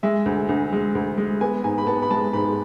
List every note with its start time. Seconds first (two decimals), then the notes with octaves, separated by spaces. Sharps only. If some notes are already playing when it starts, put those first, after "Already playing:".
0.03 G#3 E5
0.26 D2
0.49 D2
0.73 G#3
0.95 D2
1.18 G#3
1.41 B3 G#5
1.64 G#2 G#5
1.78 B5
1.87 B3 A5
2.02 B5
2.10 G#3 A5
2.33 G#2 B5